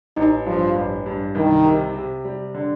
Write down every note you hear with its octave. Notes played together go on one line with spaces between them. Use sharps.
A1 D#4
G2 F3
A1
G2
C2 D#3
C3
C3
G3
D3